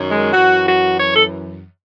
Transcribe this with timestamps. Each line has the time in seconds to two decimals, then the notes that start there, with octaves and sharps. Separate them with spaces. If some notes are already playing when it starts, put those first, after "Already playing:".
Already playing: F#2 D#3
0.11 G#3
0.33 F#2 E3 F#4
0.67 F#4
0.99 C#5
1.15 A4